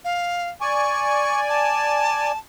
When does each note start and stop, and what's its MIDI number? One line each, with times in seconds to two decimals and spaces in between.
0.05 0.48 77
0.61 2.32 74
0.61 2.32 80
0.61 1.41 85
1.49 2.37 81